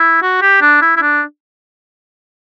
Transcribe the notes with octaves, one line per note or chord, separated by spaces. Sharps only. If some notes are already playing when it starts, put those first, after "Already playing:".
Already playing: E4
F#4
G4
D4
E4
E4
D4